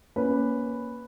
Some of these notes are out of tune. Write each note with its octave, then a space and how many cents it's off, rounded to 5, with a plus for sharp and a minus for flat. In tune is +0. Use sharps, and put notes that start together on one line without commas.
A#3 +10 C#4 +0 B4 +0